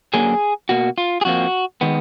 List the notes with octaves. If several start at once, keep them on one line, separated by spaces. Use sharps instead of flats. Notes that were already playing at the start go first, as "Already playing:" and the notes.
F#2 D3 F#3 A#3 G#4
B2 A#3 F#4
F4
G#4
F2 F3 A#3 F#4
D#3 G#3 B3